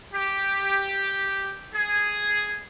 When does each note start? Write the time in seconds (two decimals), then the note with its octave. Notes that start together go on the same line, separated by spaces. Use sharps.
0.14 G4
1.75 G#4